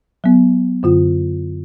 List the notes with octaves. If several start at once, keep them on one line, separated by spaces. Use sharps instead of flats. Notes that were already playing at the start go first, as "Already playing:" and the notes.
F#3 B3
F#2 D3 F4